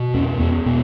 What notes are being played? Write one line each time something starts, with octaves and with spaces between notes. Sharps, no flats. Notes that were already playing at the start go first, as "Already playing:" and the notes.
Already playing: B2
E2 C#4
E2 B3
B2 B3